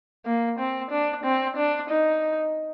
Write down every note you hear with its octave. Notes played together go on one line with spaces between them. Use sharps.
A#3
C4
D4
C4
D4
D#4